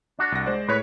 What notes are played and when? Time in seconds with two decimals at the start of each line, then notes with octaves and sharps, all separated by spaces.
0.19 D4 F#4
0.32 C2 A#6
0.46 G#3 C5 D5
0.68 A2 G#4 B4 C#5